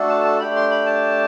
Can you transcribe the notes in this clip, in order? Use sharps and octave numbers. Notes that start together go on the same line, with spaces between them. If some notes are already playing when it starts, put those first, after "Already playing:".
Already playing: A3 D4 F#4 A4
A5
A5
A3 D4 G4 B5
C6
B5
A5